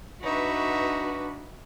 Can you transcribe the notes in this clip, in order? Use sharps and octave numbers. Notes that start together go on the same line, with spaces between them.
D4 D#4 F#4 B4 E5